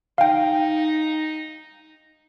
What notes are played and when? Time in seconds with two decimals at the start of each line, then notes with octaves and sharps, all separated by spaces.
0.18 D#4 F5 G5